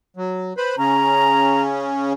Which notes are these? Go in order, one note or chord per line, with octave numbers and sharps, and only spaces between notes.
F#3
B4 C5 B5
C#3 C#4 A#5